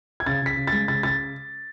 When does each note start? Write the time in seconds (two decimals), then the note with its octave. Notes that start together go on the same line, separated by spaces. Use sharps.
0.20 G#6
0.26 C#3 A6
0.42 C#3 B6
0.57 C#3
0.67 A6
0.72 G#3
0.88 C#3 A6
1.03 C#3 A6